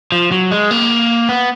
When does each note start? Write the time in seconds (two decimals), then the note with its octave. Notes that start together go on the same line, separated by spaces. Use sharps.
0.12 F3
0.32 F#3
0.51 G#3
0.71 A#3
1.29 B3